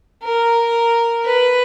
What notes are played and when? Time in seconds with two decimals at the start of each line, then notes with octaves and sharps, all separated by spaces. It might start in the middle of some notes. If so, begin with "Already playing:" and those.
0.23 A#4
1.25 B4